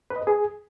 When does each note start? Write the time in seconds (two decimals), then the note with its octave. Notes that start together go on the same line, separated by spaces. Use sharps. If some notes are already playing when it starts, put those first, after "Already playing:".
0.10 B4
0.16 D#5
0.22 B4
0.27 G#4